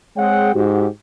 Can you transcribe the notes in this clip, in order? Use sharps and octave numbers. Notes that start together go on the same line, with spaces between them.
G#3 C4 G#4 C#5 F#5 G5
G#2 F#4 G4